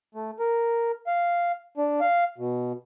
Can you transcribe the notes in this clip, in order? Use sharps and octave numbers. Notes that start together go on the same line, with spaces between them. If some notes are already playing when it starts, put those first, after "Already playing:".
A3
A#4
F5
D4
F5
B2